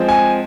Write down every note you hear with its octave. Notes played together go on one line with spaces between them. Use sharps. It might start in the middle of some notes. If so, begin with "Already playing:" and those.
Already playing: F3 G#3 C4
G#5